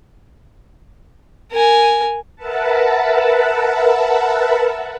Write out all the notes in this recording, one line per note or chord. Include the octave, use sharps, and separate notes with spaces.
A#4 G#5
A#4 B4 E5 F#5 A5